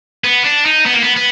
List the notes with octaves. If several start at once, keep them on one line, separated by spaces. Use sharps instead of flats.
B3
D4
D#4
B3
A#3
B3
B3